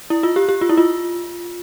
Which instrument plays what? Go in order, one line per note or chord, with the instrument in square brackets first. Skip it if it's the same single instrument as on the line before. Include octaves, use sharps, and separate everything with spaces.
[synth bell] E4
F4
G4
G4
F4
E4
F4